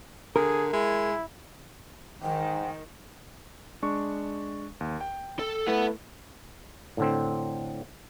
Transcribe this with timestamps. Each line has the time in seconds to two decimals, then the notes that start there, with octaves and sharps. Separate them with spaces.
0.36 D3 G#4 A#4
0.73 G#3 E4
2.23 G#2 D#3 G5
3.82 G#3 D4 C#6
4.81 D#2
5.01 G5
5.39 A4
5.67 A3 E4 A4 B4 F#5
6.97 A2 D3 C4